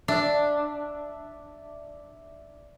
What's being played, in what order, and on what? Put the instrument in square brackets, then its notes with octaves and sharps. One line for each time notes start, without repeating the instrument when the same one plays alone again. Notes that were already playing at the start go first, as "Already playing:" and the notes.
[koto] D4 [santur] D5 E5